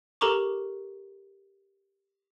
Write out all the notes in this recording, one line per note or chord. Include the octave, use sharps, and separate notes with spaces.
G4 A4 A#4 A#5 C#6 D6